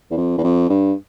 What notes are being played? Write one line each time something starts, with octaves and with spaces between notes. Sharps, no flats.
E2
F2
E2
F2
G2